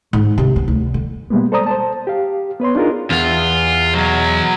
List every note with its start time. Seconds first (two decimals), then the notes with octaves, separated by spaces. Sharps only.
0.13 G#2
0.38 C3
0.56 B3
0.68 D2
0.94 D3
1.30 B2 G3 G#3 A#3 B3
1.52 A4 C5 D5 A#5 D#6
1.66 C5 A5
2.07 G4 F5
2.60 B3 B4 C#5 C6
2.75 D4 D#4 F4 G#4 A#4
3.11 E2 F4
3.94 B2 F#3